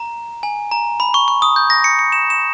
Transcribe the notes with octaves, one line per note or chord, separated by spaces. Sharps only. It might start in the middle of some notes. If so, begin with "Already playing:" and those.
Already playing: A#5
G#5
A#5
B5
C#6
C#6
D#6
G6
A#6
C#7
C#7
E7
E7